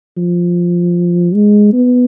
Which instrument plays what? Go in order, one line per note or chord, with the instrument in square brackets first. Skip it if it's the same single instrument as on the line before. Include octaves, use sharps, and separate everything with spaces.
[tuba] F3
G#3
B3